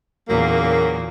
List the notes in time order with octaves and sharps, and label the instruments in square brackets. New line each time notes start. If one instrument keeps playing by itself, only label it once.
[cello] E2 A#2 [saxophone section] C#3 F#3 A#3